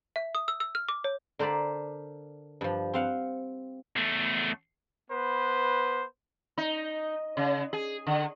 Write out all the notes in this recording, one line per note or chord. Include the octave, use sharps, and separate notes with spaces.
E5
D#6
E6
E6
F6
D6
C#5
D3 A#4 C5 D5 B5
G2 F3
C4 F5 F#5
E2 A3
B3 B4 C5
D#4
C#3
G#4
D3